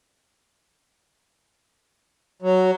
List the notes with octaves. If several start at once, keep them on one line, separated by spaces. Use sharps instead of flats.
F#3